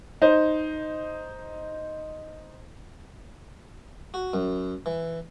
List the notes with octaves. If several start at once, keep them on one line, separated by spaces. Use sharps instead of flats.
D#4 C5
F#4
F#2
E3